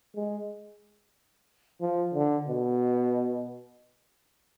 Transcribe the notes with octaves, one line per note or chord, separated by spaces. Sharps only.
G#3
F3
D3
B2